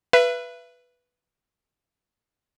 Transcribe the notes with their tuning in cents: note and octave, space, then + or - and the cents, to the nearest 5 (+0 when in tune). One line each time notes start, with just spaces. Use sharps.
B4 -5 E5 +35